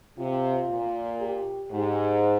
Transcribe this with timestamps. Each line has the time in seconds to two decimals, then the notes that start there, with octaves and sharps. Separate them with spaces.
0.19 C3 F4
0.69 A#2
1.20 G4
1.71 G#2 G4